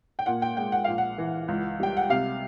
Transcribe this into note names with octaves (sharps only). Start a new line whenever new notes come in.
G5
A#2 F#5
G5
G#3 G5
F#5
A#1 F5
F#5
E3
C#2
G3 G5
F#5
C3 F5